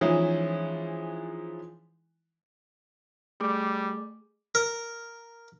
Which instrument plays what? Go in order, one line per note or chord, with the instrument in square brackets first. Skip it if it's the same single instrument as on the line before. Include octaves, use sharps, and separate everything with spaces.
[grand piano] E3 F3 G#3 C#4 D#4 E4
[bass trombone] G3 [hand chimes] A3 G#4 D6
[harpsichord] A#4